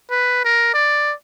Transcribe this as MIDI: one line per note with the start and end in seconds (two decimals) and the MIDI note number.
0.10 0.43 71
0.45 0.72 70
0.74 1.14 74